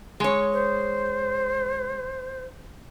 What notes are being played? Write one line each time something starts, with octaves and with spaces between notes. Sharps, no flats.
G#3 C#5
C5